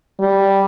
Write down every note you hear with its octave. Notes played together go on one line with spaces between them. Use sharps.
G3